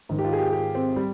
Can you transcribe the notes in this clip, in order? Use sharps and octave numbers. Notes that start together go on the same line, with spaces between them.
G#2 D#3
G4
F4
G#4
G4
G4
C4
G3